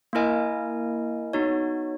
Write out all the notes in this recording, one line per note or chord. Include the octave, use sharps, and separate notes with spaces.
A#3 E4 A#4 D#5 G#5
B3 D#4 F#4 C#5